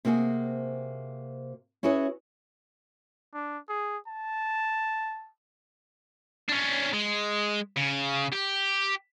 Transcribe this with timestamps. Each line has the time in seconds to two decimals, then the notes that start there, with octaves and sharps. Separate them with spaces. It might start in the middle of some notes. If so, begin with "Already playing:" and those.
0.05 C3 A#3 C4 F#4 G#4
1.83 C#4 E4 F#4 G#4 B4 C#5
3.34 D4
3.69 G#4
4.08 A5
6.49 C#4 D4
6.94 G#3
7.77 C#3
8.32 G4